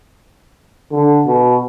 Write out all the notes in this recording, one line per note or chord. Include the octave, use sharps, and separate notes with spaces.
D3
B2